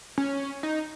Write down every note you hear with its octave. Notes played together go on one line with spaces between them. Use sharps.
C#4
D#4